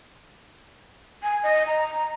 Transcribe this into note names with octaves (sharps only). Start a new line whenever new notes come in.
G#5
D#5
A#5